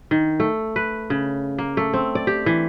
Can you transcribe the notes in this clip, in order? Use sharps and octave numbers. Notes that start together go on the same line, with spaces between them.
D#3
A3
B4
C#3
A#3
A3
C4
D5
G4
E3